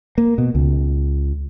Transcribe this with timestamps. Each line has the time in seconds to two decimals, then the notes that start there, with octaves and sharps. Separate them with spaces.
0.18 A#3
0.38 B2
0.55 C#2